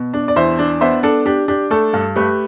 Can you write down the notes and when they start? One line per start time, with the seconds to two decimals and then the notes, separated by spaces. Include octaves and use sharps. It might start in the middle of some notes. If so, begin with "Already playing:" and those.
Already playing: B2
0.14 D4
0.28 D5
0.36 E2 C5 E5
0.59 D4
0.81 B3 C5 E5
1.03 D4 A4
1.26 D4 G4
1.48 D4 G4
1.71 A3 A4
1.93 G2
2.16 A3 G4 B4